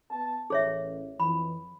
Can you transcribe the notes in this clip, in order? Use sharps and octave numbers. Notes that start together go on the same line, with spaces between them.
B3 A5
A1 G#4 C#5 E5
F2 E3 B5